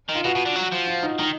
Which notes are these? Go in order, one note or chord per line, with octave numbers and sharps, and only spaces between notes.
D#3
F4
B2 F#4
B2
D3
F#3
F3
F4
D#4
D#3 D#4